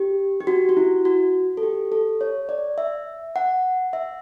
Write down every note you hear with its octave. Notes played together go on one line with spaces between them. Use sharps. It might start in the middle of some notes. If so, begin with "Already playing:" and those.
Already playing: G4
G4
F#4
F#4
E4
F#4
A4
G4
A4
C#5
D5
E5
F#5
E5